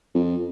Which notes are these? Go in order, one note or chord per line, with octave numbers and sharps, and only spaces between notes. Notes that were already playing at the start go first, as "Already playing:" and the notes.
F2